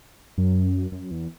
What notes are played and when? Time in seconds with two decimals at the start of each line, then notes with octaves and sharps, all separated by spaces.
0.38 F#2
0.92 F#2
1.11 E2